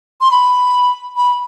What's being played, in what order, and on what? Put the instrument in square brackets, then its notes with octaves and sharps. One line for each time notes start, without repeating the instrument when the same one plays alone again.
[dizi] C6
B5
B5